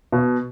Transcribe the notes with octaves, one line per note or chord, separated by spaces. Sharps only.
B2